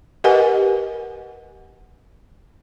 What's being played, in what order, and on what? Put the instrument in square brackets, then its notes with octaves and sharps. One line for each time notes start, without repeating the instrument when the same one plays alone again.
[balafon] G4 A#4 B4 D#5 F#5 G#5